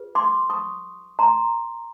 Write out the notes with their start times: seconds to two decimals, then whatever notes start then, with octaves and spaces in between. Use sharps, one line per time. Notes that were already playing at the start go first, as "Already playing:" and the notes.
Already playing: F4 G#4 B4
0.15 C6 D6
0.50 C#6 D#6
1.19 A#5 C6